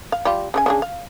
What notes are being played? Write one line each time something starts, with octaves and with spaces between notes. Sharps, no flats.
F5
G3 F4
C#3 D4 G#5
C#3 D4 G#4
F5